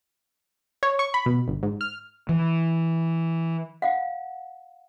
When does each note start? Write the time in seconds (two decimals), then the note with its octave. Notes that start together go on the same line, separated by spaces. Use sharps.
0.83 C#5
0.99 C#6
1.14 B5
1.26 B2
1.48 G1
1.63 G#2
1.81 F6
2.29 E3
3.82 F5 F#5